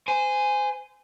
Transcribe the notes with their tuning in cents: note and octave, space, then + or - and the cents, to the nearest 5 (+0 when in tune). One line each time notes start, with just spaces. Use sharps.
C5 -25 G#5 -5